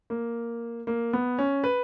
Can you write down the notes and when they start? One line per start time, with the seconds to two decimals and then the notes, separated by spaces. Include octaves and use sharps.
0.10 A#3
0.87 A#3
1.13 B3
1.39 C#4
1.64 B4